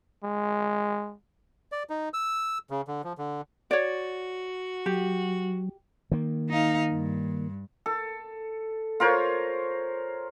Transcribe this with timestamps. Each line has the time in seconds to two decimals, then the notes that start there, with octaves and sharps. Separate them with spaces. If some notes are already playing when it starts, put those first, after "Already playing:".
0.24 G#3
1.72 D5
1.90 D#4
2.14 E6
2.70 C#3
2.88 D3
3.04 F3
3.18 D3
3.71 F#4 C#5 D5
4.86 F#3 G4
6.11 D#3 A#3
6.50 D#4 F5
6.92 G2
7.86 A4
9.00 F4 A#4 C5 C#5